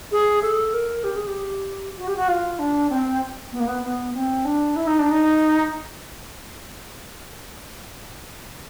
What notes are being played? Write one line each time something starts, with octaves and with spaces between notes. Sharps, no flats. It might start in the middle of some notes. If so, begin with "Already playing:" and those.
G#4
A4
A#4
G4
G#4
G4
F#4
G4
F#4
F4
D4
C4
B3
A#3
B3
B3
C4
D4
E4
D#4
D4
D#4